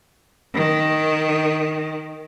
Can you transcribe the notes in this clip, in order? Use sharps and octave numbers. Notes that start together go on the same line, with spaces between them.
D#3